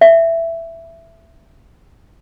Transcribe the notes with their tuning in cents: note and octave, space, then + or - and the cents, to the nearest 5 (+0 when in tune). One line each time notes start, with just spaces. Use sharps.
E5 +10